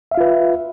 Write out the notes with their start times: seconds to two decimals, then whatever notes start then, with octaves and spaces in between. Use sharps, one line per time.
0.11 E5
0.14 F5
0.17 F4
0.20 B4